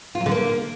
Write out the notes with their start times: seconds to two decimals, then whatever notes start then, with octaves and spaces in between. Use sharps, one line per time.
0.15 F4
0.20 F#3
0.26 D3
0.31 A#3